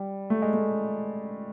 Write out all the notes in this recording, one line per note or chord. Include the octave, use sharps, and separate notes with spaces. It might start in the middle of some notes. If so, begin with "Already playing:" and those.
Already playing: G3
A3
G#3
A3